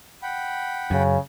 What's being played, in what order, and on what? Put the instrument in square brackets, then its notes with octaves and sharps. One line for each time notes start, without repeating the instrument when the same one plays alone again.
[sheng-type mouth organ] F#5 G5 B5
[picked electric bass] F#2 [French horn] C#3